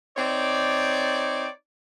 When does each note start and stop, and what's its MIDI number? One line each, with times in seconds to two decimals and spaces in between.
0.17 1.47 60
0.17 1.47 63
0.17 1.47 73
0.17 1.47 74